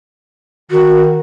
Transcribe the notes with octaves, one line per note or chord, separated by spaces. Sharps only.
D#3 F#4